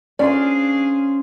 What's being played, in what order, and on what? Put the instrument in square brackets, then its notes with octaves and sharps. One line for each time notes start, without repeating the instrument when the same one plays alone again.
[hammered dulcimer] C#4 C5 F5 [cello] D4 G#4 [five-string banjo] D5